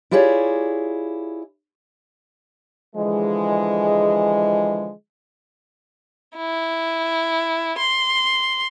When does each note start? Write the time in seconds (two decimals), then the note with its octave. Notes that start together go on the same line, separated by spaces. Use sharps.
0.11 E4 F4 G4 G#4 C#5 D5
2.96 D3 E3 F3 G#3
6.36 E4
7.78 C6